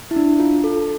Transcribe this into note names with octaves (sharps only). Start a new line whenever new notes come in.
E4
D4
F4
A4